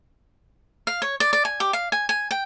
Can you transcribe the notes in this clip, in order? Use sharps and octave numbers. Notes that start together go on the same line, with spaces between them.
F5
C#5
D5
D5
G#5
G4
F5
G#5
G#5
G5